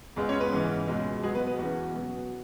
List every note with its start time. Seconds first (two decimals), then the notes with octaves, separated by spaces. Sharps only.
0.16 C#2 C#3 G#3 B3
0.29 C#4 C#5
0.40 B3 B4
0.52 G#2 E3 C#4
0.87 C#2 B2 G#3
1.23 B2 F#3 G#3 B3 G#4
1.35 B3 B4
1.46 B3 B4
1.58 E2 E3 C#4 F#4
1.94 B2 F#3 B3